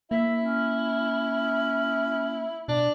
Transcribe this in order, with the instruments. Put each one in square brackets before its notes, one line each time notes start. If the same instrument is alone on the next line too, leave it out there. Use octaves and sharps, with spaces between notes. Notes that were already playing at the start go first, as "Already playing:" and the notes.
[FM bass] A#3 [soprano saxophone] E4 [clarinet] E5
[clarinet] C#4
[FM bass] B2 [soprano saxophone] D4